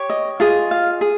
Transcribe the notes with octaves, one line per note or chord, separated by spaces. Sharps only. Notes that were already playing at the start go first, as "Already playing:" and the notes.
Already playing: G4 C#5
D#5
F4 G#4 D#5
F5
G#4